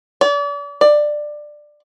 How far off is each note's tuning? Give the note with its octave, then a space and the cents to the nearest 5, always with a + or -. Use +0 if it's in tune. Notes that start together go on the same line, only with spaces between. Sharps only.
D5 -40
D5 +15